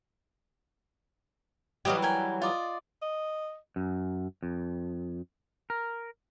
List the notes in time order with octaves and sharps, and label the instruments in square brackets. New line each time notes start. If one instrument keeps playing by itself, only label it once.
[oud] E3 F#3 G3 [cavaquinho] G4 D#5 F5
[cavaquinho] A#4 G5 G#5
F4 D5 D#5
[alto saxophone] D#5
[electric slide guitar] F#2
F2
A#4